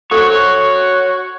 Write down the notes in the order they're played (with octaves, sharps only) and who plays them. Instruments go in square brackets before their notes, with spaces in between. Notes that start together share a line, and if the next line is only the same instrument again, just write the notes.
[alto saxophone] F#4 [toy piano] A4 C5 [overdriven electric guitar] C#5